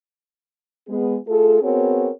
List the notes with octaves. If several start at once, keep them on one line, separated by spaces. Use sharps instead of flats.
G#3 B3 G#4
A3 F4 G#4 A4
B3 C4 F#4 G#4 A#4 C#5